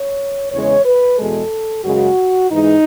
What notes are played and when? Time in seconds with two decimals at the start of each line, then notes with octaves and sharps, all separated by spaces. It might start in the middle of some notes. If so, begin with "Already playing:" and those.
Already playing: C#5
0.52 E2 C#3 E3 G#3 C#5
0.85 B4
1.18 E2 B2 G#3 A4
1.84 F#2 C#3 G#3 F#4
2.51 G#2 E3 G#3 D#4